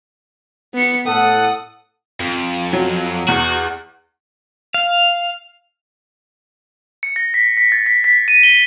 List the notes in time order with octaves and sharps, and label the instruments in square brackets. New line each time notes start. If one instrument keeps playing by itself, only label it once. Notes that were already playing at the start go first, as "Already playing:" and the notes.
[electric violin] B3 C#7
[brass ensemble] A2 A4 F#5 [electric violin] D#6
[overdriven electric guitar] F2
[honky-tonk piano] F#3
[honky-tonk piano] E2 [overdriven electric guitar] F#4
[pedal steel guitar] F5
[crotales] C#7
A#6
B6
B6
A6
B6
B6
D#7
G7